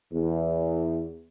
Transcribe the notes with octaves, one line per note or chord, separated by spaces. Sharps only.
E2